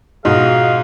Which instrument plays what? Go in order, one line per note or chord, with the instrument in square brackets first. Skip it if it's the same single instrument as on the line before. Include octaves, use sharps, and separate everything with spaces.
[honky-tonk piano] G#2 [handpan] B2 F#4 D#5 [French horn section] G#3 F4 G#4 [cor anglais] F5